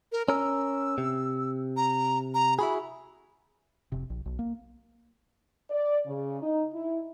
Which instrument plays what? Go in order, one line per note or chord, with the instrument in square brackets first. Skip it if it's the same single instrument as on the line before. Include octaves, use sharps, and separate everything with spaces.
[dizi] A#4
[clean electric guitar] C#4 A#4 [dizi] E6
[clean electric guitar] C3
[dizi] A#5
A#5
[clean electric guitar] E4 F#4 G#4 [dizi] B5
[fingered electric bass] F1 C3
A#1
B1
A#3
[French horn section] D5
C#3
D#4
E4